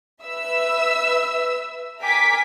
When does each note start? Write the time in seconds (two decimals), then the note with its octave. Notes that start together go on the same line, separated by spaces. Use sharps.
0.24 B4 E5 E6
2.01 A#4 G5 G#5 D6 B6